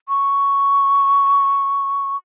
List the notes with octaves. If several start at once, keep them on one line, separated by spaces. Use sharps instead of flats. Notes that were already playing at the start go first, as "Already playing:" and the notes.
C#6